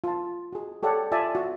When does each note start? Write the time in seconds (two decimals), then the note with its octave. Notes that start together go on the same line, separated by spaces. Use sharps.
0.04 F4 A5
0.53 F#4 G#4
0.83 G4 A4 C#5 D5 F#5
1.12 F4 D5 E5 G#5 A5
1.35 F#4